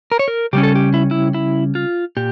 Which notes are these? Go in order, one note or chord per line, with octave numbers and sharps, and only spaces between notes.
A#4
C#5
A#4
C#3 G3 C#4 G4
A4
G4
E4
E4
E4
F4
A#2 G4